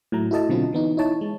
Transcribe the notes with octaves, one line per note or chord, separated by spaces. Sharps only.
A2 F#3 A3 A#5
E4 F#4 A4 D#5 A5
B2 D3 F#3 C4 F4
E3 B3 D#4
D#4 E4 C#5 A5
G#3